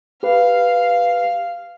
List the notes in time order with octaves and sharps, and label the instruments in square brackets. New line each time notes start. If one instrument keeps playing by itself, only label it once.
[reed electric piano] G4 B4 [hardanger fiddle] F5